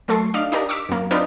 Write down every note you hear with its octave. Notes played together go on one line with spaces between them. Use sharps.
F#3 A3 A4 C6 C#6 C7
D4 D#4 D5 F5
D4 D#4 G4 A#4
C#6 D6 E6 B6
F#2 A#3
C4 D4 D#4 F4 B4